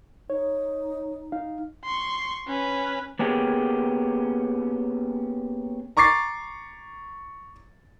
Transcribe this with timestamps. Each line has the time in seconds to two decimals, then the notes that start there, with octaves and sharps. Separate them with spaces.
0.30 D#4 C#5
1.32 D#4 F5
1.85 C6 C#6
2.48 C#4 B4
3.19 A#3 B3 C#4 G4 G#4
5.97 A#5 C#6 D6 A6 C7